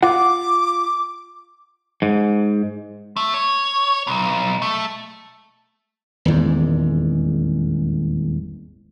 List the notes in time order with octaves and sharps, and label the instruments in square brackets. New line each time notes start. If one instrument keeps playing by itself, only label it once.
[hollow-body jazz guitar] F4 F#5 [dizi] D6
[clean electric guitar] G#2
[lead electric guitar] A3
C#5
B1
A3
[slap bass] D#1 G#1 E2 G#2